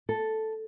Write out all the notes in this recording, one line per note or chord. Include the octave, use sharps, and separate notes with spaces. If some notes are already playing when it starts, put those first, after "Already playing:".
A4